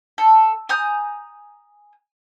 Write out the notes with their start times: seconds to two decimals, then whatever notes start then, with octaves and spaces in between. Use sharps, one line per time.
0.18 A4
0.69 G#5 A#5 D#6 G6